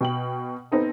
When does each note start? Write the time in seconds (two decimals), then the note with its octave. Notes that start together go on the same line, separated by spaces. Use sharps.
0.01 B2 G5 F#7
0.72 B3 C4 D#4 A4